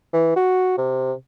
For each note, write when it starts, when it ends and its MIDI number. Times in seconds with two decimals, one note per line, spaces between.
0.13 0.34 52
0.36 0.78 66
0.78 1.13 48